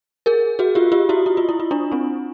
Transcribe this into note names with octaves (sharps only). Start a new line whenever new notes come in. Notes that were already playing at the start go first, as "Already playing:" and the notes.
G#4 A#4
F#4 G#4
F4 G4
F4 G4
E4 F#4
E4
F4
E4
F4
D4 E4
C4 D4